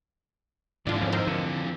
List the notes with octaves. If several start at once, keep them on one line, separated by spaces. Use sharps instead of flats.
F2 G#2 E3 D4 F4
D#2 F3 C#4
A#4 C5 D#5
D3